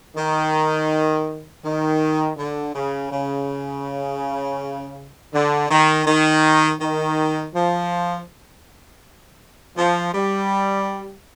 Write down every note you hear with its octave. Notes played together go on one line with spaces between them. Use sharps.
D#3
D#3
D3
C#3
C#3
D3
D#3
D#3
D#3
F3
F3
G3